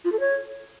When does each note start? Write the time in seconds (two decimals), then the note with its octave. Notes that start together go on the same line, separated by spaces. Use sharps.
0.05 F4
0.12 A4
0.20 C#5